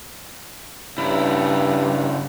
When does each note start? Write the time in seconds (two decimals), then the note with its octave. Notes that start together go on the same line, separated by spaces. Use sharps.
0.98 G2 C#3 E4